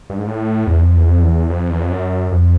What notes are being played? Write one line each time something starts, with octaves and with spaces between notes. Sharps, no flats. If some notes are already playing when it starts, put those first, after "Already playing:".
G2
G#2
A2
E2
F2
E2
F2
E2
F2
E2
F2
F#2
F2